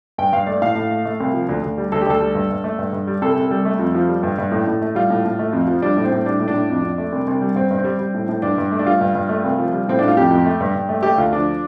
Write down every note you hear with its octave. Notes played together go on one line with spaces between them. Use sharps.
G2 G5
G2 F5
A3 D5
A2 F5
A2
A3
A3
C2
F3
D2
D2
G3
D2 A4
G4
D2 A4
G3
G2
G2
A3
G2
G2
G3
C2 A4
C2
G3
A3
F2
F3
G3
G2
G2
A2
A2
A3
G3 F4
A2
A2
A3
F2
F3
G3 D4
A2
C4
A2
G3 D4
A2
D4
A2
F2
F2
A3
C2
C2
G3
G2 C4
G2
C4
G3
G3
A2
A2
G2 D4
G2
A3
D4
G3 F4
G2
G2
A3
C2
F3
G3
A2 C4
A2 D4
F4
F2 G4
F2
A3
G2
G2
A3
A3 G4
D2 F4
F3 D4